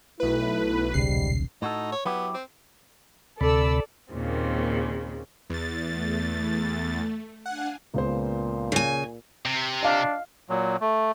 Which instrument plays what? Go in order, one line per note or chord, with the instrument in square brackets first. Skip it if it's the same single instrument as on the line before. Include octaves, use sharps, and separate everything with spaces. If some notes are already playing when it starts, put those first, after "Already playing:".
[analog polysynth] B1 B4 [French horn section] A3 E4
[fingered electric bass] D#1 B1 C#3 [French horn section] G#2 G3 [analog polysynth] C7
[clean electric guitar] A2 F#4 A4 [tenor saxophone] D#4
[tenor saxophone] C#5
[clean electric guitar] F#3 E4 G4 [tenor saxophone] B3
[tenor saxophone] C4
[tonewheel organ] D2 C3 B5 [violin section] A4 D5 E6
[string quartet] D#2 A#2 C#3 C4
[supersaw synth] E2 A6
[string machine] A3
[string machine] D4 F5 G#5 [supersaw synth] F#5
[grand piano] C#2 B3 C5 [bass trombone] A#2
[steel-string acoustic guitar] C#3 G#5
[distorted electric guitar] C3
[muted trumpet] D4 [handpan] D#5 F5
[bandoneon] A#2 F#3
A3